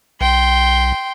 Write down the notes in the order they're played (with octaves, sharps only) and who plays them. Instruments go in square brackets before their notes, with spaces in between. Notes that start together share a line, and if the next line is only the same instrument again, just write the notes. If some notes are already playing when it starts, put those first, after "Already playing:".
[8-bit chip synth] B1 [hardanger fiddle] G5 C6